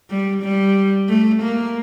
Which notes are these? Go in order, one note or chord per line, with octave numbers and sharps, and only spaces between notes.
G3
G3
A3
A#3